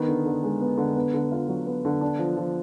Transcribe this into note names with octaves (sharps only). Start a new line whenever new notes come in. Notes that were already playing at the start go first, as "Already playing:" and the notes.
Already playing: D#3 B3
D3
D3
G#3
B3
D3
B3
D3
F4
F#3
B3
D3
D4
F3
F3